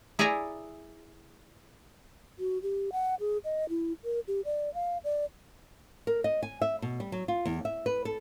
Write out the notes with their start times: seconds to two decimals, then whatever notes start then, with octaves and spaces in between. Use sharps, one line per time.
0.19 E4 G#4 D5 E5 G#5 A#5
2.39 F#4
2.62 G4
2.92 F#5
3.20 G#4
3.44 D#5
3.69 E4
4.04 A#4
4.28 G4
4.45 D5
4.74 F5
5.04 D5
6.07 A#4
6.24 D#5
6.43 G#5
6.62 E5
6.82 B2
7.00 G3
7.12 F#3
7.28 F4
7.45 E2
7.65 E5
7.86 B4
8.05 A4